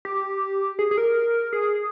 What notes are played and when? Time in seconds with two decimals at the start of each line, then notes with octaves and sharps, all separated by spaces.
0.05 G4
0.79 G#4
0.91 G#4
0.98 A#4
1.53 G#4